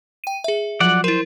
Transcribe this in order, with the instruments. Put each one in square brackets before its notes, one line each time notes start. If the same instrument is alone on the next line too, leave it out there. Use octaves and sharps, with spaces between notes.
[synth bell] G5 D#7
G#4 E5
[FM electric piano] F3 F#3 [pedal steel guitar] D5 F#5
[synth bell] E4 A#4 [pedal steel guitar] C5